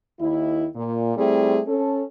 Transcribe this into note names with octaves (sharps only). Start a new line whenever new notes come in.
D#2 D#3 E4
A#2
G3 A3 C4 E4 G#4
C#4 A4